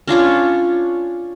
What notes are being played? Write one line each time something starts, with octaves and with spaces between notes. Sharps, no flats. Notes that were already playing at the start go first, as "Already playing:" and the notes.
C#4 D4 F4 C#5